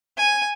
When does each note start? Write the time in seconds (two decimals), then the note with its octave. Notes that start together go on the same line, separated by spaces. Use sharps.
0.17 G#5